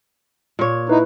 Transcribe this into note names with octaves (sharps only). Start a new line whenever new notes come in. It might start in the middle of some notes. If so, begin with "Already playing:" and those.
A#2 C#5
D#4 E4 B4